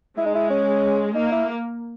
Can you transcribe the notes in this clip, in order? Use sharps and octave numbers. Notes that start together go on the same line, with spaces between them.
G#3 E4
D#4
E4
C#4
A#3 D#4
E4